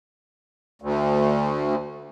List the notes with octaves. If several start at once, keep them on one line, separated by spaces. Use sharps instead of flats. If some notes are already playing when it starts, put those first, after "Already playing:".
D2